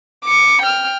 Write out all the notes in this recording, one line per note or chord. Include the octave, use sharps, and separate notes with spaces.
D6 C#7
G5 F6